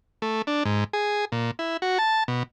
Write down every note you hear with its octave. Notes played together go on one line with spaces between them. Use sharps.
A3
D4
G#2
G#4
A#2
E4
F#4
A5
B2